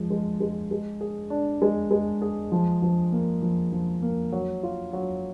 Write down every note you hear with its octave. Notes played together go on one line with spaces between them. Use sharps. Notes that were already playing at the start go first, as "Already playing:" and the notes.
Already playing: F3 G#3
G#3
G#3
G#3
G#4
D4
G#3
G#3
G#4
F3
F3
A#3
F3
F3
A#3
F#3
F4
F#3